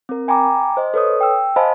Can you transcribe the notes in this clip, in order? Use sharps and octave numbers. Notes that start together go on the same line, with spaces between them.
C4 A#4
G5 G#5 A#5 B5 D6
C5 D#5
A4 B4 C#5 D#6
G5 E6
C5 D#5 F5 G#5 A5 B5